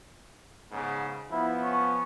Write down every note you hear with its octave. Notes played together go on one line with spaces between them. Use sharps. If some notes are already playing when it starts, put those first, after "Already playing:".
G#2 C#3 B3
F3 B3 E4
C#4